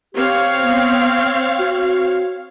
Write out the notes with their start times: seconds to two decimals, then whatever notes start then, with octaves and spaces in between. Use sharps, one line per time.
0.14 C4 G4 C#5 F5
0.63 B3
1.59 F#4